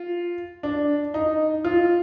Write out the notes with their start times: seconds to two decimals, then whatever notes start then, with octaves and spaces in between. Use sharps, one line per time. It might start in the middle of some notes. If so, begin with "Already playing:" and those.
Already playing: F4
0.63 D4
1.14 D#4
1.65 F4